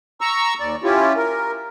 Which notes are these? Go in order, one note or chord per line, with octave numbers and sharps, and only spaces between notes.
A#5 C#6 E6
D#2 D5
C#4 E4 F4 G4
A#4